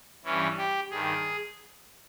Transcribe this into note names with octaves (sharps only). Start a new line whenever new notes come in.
G2 E3 C#4
G4
G2 D#3 G#4